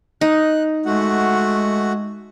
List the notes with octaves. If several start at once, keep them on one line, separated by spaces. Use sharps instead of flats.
D#4 F#6
G#3 A3 F#4 F#5